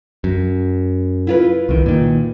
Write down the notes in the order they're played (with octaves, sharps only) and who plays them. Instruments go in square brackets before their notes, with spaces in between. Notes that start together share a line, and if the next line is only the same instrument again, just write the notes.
[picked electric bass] F#2
[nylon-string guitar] E4 F4 B4
[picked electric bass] C2 F2 D#3
A#2 D#3